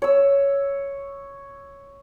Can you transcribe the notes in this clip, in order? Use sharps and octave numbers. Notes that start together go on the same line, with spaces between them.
C#5 E6